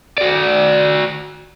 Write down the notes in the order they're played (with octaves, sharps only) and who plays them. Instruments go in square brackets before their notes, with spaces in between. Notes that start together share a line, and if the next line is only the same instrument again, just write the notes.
[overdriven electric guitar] F#4 D5